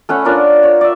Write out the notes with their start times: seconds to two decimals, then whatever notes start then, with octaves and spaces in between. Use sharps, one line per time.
0.09 A3 C#4 F#5 B5
0.25 D4 F4 A#4 C#5
0.63 C#5
0.81 D5 E5